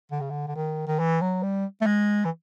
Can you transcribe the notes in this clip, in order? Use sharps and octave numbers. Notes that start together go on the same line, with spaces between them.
D3
C#3
D3
D3
D#3
D#3
E3
F#3
G3
A3
G#3
E3